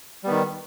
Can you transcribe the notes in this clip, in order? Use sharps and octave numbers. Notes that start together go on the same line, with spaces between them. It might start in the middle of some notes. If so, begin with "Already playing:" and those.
D#3 G3 B3